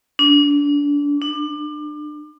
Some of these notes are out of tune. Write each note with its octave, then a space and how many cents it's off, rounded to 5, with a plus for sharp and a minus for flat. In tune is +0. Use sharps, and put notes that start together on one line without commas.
D4 -25
D4 +30